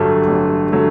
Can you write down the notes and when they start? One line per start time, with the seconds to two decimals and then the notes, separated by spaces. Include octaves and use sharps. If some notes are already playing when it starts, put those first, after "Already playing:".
Already playing: A1 G2 D3 F#3 A3
0.28 A1
0.72 D3 F#3 A3